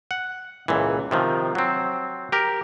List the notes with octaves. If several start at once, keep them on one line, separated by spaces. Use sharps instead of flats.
F#5
C#2 A#2 E3
C3 D#3 F3
F#3 C4
G4 A#4